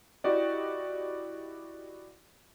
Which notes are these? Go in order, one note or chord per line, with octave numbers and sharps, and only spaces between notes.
E4 F#4 G4 D5 D#5